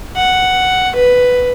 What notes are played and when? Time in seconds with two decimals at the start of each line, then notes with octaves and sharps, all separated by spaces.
0.16 F#5
0.95 B4